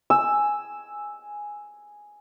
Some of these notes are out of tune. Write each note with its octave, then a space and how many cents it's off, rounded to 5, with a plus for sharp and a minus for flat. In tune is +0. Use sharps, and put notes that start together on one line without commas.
G#5 +0 E6 +0